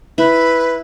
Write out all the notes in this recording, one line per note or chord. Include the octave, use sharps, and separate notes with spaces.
E4 B4